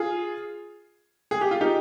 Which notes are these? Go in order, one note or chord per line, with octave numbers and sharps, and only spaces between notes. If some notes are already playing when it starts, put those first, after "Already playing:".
Already playing: F4 G#4
G#4
G4
F4
D#4 G4